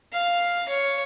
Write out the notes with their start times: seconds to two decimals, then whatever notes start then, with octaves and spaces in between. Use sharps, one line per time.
0.13 F5
0.69 C#5